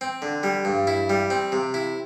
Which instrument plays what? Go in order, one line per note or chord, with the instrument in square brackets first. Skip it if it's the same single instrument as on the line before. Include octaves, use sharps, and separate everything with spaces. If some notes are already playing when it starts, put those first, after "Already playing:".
[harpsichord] C4
D3
G3
G2
E4
G3
C4
C3
E4